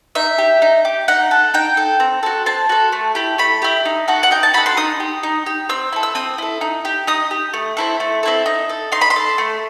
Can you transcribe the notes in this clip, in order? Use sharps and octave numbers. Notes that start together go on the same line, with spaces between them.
D#4 E5
G4
D#4
G4
D#4 F#5
A4
D#4 G5
A4
C4
F#4 A4
C4 A5
F#4 A4
A3
E4 G4
A3 B5
E4 G4
D#4
F#4 A4
F#5
D#4 G5
A5
F#4 A4 B5
C6
D#4 D#6
G4
D#4
G4
C4 E6
E4 A4
E6
C4 D#6
E4 A4
D#4
G4
D#4 D#6
G4
A3
C4 E4 A4
A3
C4 E4 A4
D#4
A4
D#4 C6
B5
C6
A4
A3